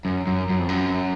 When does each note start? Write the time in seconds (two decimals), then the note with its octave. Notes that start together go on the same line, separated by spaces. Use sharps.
0.05 F#2
0.27 F#2
0.50 F#2
0.59 F2
0.69 F#2